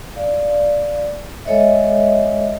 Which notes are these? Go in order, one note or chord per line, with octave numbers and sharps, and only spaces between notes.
D5 F5
G#3 A4 C#5 D#5 E5